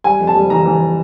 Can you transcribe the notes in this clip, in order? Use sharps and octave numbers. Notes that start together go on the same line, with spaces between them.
G3 G#5
F2
A5
G3
E3 A#5
E3